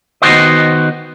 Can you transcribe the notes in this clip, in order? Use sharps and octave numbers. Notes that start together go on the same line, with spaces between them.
D#3 B3 F#4 C5 D#5